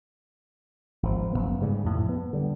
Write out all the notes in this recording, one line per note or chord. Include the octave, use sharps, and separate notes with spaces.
G#1 F3
F#1 G2 B3
G#2 C#3 G3
F2 A2 C3
B3
D3 G3